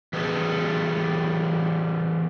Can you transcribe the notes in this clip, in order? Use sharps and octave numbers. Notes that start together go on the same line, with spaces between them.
E3 F#3 G3 A3 G#4 A4